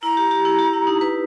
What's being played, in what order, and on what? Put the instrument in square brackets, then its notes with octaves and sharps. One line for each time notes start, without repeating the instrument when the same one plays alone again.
[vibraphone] E4 [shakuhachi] A#5
[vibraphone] G4
G4
E4
G4
E4
D#4
B4